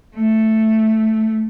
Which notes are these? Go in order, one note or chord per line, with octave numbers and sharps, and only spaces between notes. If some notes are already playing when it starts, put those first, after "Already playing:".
A3